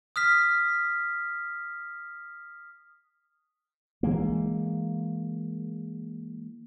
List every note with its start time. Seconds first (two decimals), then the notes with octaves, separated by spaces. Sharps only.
0.16 D#6 F6 B6
4.03 E3 G#3 A#3